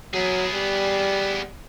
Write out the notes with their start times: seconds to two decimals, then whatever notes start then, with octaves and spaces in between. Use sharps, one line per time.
0.14 F#3 B3 G#4
0.54 G3